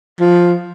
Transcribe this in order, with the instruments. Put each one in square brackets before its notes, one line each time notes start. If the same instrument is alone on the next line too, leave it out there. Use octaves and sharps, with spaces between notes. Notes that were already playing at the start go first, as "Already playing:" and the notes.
[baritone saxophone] F3